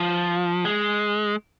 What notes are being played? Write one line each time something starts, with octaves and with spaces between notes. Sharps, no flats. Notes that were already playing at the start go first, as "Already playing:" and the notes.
Already playing: F3
G#3